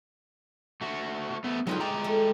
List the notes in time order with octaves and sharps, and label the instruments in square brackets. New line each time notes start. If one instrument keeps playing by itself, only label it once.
[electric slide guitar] A3 F#4
A3 B3
[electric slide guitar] F#3 D#4 F4 [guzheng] G#3 B4 G5
[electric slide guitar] G#3 G5 A#5 [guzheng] D5
[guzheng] A3